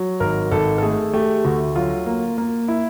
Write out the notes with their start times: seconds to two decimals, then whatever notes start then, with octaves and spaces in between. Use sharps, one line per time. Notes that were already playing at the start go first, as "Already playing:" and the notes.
Already playing: F#3
0.20 G#1 A#4
0.51 G#1 A4
0.78 A4
0.82 A3 G#4
1.13 A3 G4
1.45 D2 F#4
1.76 F#3 F4
2.06 A#3
2.38 A#3
2.68 E4